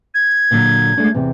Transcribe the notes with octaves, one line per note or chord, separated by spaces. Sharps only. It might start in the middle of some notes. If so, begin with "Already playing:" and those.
G#6
A#2 D3 F#3
G#3 A3 D4
E2 C3